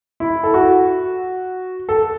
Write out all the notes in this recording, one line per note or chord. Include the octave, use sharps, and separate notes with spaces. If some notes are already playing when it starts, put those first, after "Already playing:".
E4
A4
F#4
A4